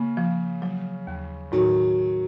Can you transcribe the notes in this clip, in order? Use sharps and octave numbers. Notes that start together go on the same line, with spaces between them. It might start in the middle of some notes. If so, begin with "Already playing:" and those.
Already playing: C#3 A#3
F3
F#3
D#2
A2 D#3 F#3